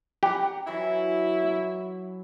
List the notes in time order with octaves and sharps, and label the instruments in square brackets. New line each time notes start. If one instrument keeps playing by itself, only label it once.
[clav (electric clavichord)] G4 [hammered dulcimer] F#5 A#5 B5
[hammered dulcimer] E3 F#3 [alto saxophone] E4